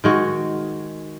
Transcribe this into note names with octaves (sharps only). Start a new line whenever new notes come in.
D#3 G#3 F#4